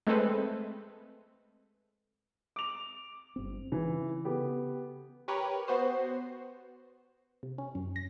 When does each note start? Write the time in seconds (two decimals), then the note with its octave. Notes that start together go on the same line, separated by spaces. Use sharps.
0.07 G#3 A3 C4 A4 B4 C5
2.56 D6 F7
3.36 G1 C4
3.72 C#3 E3
4.24 B3 G4 A4
5.28 G4 A#4 B4 C#5
5.67 B3 F#4 C5 C7
7.43 C3
7.58 C#4
7.75 F#2
7.96 A#6